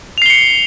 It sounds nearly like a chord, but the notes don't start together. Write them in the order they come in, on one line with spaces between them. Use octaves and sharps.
F7 C7 G7 C#7